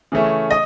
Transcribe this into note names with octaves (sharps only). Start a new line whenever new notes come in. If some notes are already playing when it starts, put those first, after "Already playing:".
C#3 E3 A3 C#4
D#5